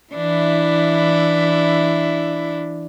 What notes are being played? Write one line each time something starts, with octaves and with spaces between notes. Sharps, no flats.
E3 D4 E4